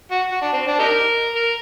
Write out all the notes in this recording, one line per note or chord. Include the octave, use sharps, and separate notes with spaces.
F#4
F#4
D4
C4
D4
D#4 G4 A#4
A#4